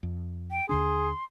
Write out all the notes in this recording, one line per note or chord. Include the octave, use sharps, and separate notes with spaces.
F2
G5
D#2 D3 D4 G#4 C6